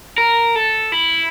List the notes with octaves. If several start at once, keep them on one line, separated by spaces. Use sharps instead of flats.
A#4
A4
E4